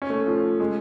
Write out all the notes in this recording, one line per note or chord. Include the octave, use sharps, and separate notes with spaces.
C#4
A3
F3
G#3